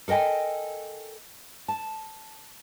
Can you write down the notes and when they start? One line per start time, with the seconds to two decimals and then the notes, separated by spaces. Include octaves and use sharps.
0.08 A4 A#4 D#5 G5 G#5
1.68 A5